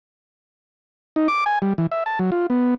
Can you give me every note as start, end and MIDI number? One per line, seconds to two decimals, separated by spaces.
1.16 1.28 63
1.28 1.44 86
1.46 1.59 80
1.62 1.73 55
1.78 1.87 52
1.92 2.04 76
2.06 2.19 81
2.19 2.30 54
2.32 2.47 65
2.50 2.74 59